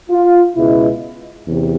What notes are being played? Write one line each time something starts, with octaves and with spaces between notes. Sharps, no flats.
F4
C#2 B2 G#3 E4
E2 C3